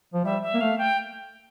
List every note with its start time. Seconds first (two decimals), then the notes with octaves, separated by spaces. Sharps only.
0.14 F3
0.24 G3 E5
0.42 E5
0.54 A#3
0.61 A3 F5
0.78 G5